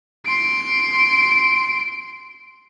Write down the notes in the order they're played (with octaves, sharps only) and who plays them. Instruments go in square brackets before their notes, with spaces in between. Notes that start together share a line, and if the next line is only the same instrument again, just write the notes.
[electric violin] C6 D7